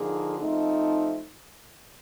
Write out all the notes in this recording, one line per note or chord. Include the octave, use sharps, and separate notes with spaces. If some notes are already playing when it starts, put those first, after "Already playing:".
Already playing: D3 F3 A#3 D#4 G#4
F3 A3 C4 D#4